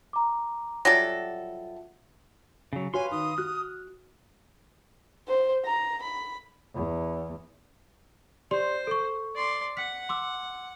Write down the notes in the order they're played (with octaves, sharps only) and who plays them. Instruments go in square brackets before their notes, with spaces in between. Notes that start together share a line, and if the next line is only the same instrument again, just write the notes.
[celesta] A#5 D6
[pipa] F#3 G3 A4 [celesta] F4 E5 F#5 [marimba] A#6
[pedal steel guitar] C#3 F#3
[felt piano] F#4 C#5 [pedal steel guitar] B4 F5 C6 [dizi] G#5
[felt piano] D#3 [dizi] D#6
[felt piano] F#4 [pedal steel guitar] F6 F#6
[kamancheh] C5
A#5
B5
[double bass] E2
[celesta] G4 D5 C6 [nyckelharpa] C5
[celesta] A4 C#6
[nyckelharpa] D5 C6
[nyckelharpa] F#5 [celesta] B6
[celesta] C6 D6 E6